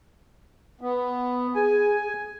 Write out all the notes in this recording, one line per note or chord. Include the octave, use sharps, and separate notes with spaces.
B3
G#4 G#5